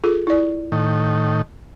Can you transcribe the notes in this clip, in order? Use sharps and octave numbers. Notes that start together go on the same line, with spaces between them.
F4 G#4 A4
E4 D5
A2 D#3